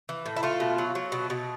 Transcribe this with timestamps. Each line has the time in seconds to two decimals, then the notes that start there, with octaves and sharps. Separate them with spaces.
0.09 E3
0.26 A2
0.36 E4
0.43 A3 F4
0.60 B2
0.78 F#3
0.95 F#3
1.12 B2
1.30 B2